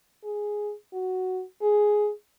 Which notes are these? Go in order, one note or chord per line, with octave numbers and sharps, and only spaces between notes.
G#4
F#4
G#4